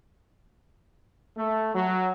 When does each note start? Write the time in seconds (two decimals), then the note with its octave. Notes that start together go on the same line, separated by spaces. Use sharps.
1.37 A3
1.75 F#3